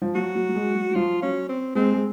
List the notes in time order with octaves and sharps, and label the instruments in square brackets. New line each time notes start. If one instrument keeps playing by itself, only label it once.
[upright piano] F3
[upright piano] F#3 [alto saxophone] F#4
[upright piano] F#3
F#3
G#3
F#3
F#3
[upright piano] F3 [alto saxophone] F4
[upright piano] F#3 [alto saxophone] C#4
[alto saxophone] C4
[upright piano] G#3 [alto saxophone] C4
[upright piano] G#3